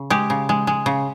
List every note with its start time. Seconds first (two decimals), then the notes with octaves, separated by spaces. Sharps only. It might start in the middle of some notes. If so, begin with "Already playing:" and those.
Already playing: C#3
0.10 G#3 G4
0.30 C#3
0.49 G#3
0.67 G#3
0.86 C#3